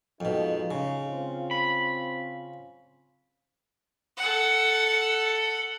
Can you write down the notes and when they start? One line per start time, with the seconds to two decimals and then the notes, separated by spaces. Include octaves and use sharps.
0.20 F2 B2 G#3 D#4 F4
0.71 C#3
1.10 C4 F4
1.51 B5
4.17 A4 F#5